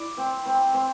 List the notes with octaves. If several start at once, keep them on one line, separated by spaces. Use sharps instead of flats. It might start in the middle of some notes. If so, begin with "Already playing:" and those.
Already playing: E4 D5
C4
C4
C4